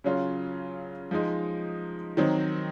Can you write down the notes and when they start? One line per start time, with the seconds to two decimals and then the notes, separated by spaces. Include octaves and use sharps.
0.04 C#3 F#3 C#4 F4
1.11 F3 G#3 D#4
2.17 D#3 F#3 C4 D#4